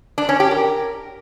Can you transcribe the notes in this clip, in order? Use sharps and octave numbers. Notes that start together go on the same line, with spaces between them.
D4
C#4
G4
A#4